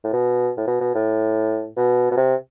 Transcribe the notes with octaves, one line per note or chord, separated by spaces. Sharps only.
A2
B2
A2
B2
B2
A2
B2
B2
C3